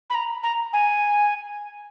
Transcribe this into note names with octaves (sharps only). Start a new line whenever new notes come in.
B5
A#5
A#5
G#5